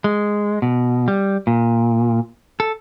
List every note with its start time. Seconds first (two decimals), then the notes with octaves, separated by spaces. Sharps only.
0.04 G#3
0.62 B2
1.08 G3
1.47 A#2
2.60 A4